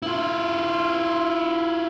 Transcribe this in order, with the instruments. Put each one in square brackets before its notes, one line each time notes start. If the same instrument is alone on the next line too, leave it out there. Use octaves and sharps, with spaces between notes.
[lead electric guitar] E4 F4